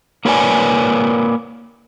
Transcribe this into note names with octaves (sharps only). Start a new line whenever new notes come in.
A#3 A#4 B4 C#5 D5 G#5